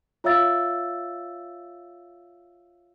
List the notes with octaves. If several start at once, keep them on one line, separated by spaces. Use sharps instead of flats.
F4 C#5 E5 F5 E6 A6